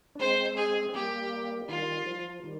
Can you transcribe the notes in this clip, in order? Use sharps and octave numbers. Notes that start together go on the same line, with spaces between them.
D4
G#3 C4 C5
G#4
C4
G3 A#3 G4
D#3 G3 F4
F3
D#3 G3